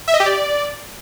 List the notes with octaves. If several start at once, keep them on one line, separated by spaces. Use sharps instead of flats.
E5
D#5
G4
D5